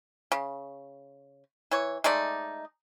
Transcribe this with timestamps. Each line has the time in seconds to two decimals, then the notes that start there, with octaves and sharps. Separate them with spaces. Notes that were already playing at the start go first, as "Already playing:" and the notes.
0.32 C#3
1.71 E3 C#5
2.04 G#3 A3 D#4 D5